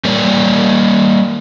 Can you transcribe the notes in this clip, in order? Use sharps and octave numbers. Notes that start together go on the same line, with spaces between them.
G3 A#3 A#4 C#5 D5